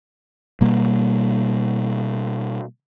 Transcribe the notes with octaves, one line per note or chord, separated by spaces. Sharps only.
B2 G3 A#3